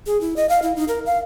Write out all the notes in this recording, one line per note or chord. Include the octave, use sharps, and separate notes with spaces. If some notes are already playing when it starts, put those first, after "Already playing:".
G#4
E4
D#5
F5
E4
D#4
A#4
F5